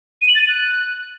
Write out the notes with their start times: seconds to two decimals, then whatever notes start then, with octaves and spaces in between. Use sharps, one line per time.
0.21 D#7
0.28 F#7
0.35 A6
0.41 D#7
0.48 F#6